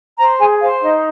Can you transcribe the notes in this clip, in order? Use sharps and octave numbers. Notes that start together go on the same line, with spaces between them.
C5 A#5
G#4 G#5
C5 F5
D#4 D#5